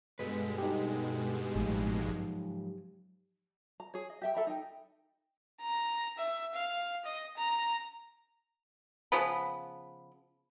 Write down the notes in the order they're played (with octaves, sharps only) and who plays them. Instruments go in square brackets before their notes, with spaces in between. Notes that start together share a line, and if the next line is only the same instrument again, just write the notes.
[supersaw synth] G2 B2 G#3 [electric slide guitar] A4 B4
[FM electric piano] D#4 G4
[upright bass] A1 A3 [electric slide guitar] G#2 F3
[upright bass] F#3
[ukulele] A#5
G#4 C#5
D#5
G4 E5 G5
A4 E5 A#5 B5
D#4 G5
[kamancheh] A#5
E5
F5
D#5
A#5
[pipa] C#3 F3 B3 B5